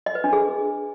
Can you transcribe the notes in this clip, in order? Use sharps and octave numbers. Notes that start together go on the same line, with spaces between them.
D#5
B4
D4
G#4